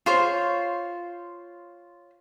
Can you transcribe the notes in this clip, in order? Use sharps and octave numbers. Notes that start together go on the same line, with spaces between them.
F4 C5 C#5